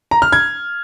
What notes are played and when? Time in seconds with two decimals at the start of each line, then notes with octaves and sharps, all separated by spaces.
0.11 A#5
0.22 F6
0.32 G#6